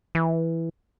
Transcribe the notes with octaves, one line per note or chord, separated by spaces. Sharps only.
E3